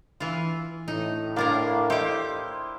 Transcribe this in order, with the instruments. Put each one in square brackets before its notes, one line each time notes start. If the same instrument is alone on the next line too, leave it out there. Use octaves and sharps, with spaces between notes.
[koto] E3 F4
[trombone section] A2 [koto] D#4
[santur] A#3 [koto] D4 F4 A#4
[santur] E4 C5 D#5 [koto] G4 G5